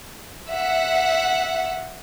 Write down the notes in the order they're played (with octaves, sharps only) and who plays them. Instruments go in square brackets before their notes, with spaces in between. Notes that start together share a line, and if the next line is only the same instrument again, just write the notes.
[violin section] E5 F#5